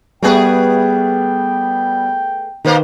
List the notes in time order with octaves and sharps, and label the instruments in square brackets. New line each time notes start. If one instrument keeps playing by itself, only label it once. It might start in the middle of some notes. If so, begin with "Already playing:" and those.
[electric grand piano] G3 B3 [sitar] A3 G#4 B4 [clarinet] G5
[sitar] B2 A#3 C5 [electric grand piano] D#3 B4